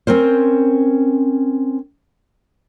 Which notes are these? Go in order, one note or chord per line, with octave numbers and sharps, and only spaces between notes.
C4 C#4 A#4 C5